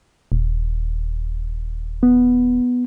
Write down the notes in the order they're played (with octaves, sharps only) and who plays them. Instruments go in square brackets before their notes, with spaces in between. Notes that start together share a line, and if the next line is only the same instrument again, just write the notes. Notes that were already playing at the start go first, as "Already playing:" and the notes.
[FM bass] D#1
[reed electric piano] B3